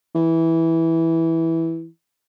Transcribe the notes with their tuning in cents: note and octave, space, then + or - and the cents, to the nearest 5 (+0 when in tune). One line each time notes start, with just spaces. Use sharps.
E3 -10